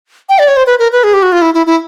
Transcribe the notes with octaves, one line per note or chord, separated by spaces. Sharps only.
G5
D5
C#5
C5
B4
A#4
B4
G#4
G4
F#4
F4
E4
E4
E4